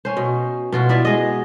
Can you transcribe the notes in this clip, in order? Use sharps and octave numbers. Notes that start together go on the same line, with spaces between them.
C#4 C5
B2
B2 F4 F#4
B3 E4 D5 E5
G#3 D#5